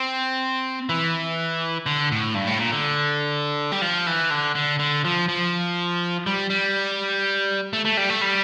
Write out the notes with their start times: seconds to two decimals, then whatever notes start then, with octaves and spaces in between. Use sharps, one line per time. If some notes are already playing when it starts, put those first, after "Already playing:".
Already playing: C4
0.89 E3
1.86 D3
2.12 A2
2.35 G2
2.47 A2
2.59 A#2
2.72 D3
3.72 G3
3.82 F3
4.07 E3
4.31 D3
4.55 D3
4.79 D3
5.05 F3
5.29 F3
6.26 G3
6.50 G3
7.73 A3
7.85 A3
7.97 G3
8.10 A3
8.21 G3